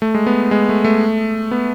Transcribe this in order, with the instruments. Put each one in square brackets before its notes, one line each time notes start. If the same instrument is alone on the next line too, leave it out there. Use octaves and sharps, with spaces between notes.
[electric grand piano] A3
G#3
B3
G#3
A3
A3
B3